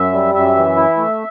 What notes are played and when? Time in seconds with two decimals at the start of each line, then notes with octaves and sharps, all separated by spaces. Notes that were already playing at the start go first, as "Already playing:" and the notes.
Already playing: F#2 E5
0.13 G3
0.34 F#2 E5
0.55 E3
0.76 E4
0.97 A3